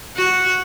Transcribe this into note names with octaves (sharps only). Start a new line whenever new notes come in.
F#4